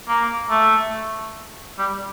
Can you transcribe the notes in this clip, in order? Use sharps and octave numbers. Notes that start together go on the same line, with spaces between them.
A#3
A3
G3